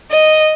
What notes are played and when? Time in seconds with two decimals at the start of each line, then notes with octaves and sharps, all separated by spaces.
0.12 D#5